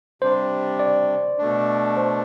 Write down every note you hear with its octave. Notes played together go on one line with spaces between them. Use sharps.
C3 G3 D4 C5
D5
B2 A3 D4
C5